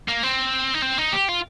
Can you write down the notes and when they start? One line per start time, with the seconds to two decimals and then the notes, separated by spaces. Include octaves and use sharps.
0.08 A#3
0.23 C4
0.74 D#4
0.82 C4
0.98 D#4
1.12 G4
1.28 F4